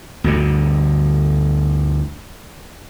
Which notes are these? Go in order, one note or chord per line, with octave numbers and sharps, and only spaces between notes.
D2 G2 D3